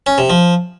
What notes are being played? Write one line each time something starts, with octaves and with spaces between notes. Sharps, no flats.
C#4
C3
F3